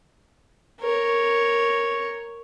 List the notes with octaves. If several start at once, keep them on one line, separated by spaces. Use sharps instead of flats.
A#4 C#5